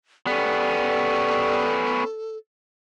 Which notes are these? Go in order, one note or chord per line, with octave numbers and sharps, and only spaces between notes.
G3 B3 C#4 A4